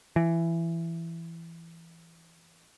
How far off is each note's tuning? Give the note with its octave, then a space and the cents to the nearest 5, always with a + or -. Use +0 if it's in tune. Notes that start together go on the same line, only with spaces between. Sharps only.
E3 +15